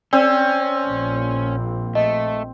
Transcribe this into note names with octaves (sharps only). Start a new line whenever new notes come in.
C4 C#4 D5
A#1
A3 D#5